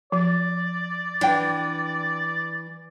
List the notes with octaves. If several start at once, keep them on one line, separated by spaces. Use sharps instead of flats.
F3 D5
E3 D4 G5